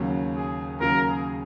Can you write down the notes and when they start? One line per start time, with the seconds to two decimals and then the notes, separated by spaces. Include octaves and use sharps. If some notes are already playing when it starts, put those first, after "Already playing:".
Already playing: D#2 C#3 F#3
0.36 G#4
0.80 D#2 C#3 F#3 A#4
1.09 G#4